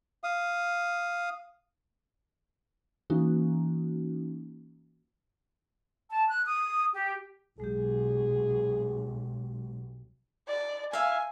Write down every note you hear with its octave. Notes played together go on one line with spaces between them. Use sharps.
F5 D#6
E3 A#3 C#4 D#4 F#4
A5
F#6
D#6
G4
B1 G#3 G4 G#4
D5
E5 F5 G#5